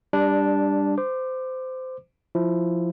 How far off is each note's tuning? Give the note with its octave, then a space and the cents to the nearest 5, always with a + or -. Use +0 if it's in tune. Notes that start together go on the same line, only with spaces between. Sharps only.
G3 +15 D4 -5
C5 -20 D6 +20
F3 +0 E4 +0